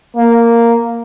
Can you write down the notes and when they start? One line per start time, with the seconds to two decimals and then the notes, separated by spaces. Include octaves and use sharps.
0.16 A#3